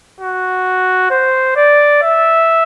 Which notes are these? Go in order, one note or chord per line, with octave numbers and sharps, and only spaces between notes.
F#4
C5
D5
E5